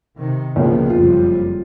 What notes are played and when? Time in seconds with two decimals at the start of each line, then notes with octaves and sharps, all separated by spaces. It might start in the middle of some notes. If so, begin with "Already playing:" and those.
0.17 C3 D#3
0.56 C#2 B2 D3 F3 A#3
0.90 F#1 F2 G3 F4